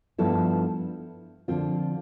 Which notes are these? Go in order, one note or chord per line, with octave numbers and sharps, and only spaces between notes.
G2 F3 B3 E4 A4
D3 F3 C4 F4